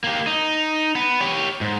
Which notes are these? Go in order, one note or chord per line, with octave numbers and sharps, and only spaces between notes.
A#3 G4
D#4
B3
G4 C#5
G#2